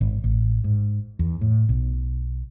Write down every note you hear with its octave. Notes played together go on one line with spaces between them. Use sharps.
G#1
A1
G#2
E2
A2
B1